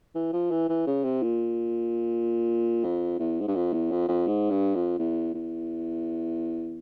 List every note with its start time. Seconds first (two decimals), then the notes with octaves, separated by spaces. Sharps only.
0.15 E3
0.33 F3
0.51 E3
0.69 E3
0.87 C#3
1.04 C3
1.23 A#2
2.84 F2
3.19 E2
3.41 G#2
3.48 G2
3.55 F2
3.73 E2
3.92 F2
4.09 F2
4.27 G#2
4.50 G2
4.75 F2
4.99 E2
5.34 E2